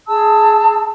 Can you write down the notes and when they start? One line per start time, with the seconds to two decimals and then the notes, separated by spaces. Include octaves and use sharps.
0.08 G#4 A5 E6